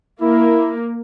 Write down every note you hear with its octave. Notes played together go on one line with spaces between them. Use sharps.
A#3 E4